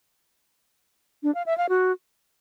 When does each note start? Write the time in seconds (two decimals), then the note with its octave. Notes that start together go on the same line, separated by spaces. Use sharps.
1.23 D4
1.35 F5
1.46 E5
1.58 F5
1.69 F#4